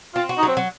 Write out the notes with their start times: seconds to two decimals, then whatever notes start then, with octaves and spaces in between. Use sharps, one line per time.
0.14 C4 F4
0.29 F#4
0.37 D#4
0.43 F#3 C4
0.57 F#3